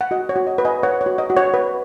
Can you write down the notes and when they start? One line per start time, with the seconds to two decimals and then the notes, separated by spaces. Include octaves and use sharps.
0.01 F#5
0.11 F#4 D#5
0.29 C#5
0.36 F#4
0.47 D#5
0.58 B4
0.65 D#5 G#5
0.82 B4 C#5 F#5
1.01 C#5
1.06 F#4
1.18 D#5
1.30 F#4
1.37 C#5 F#5
1.54 B4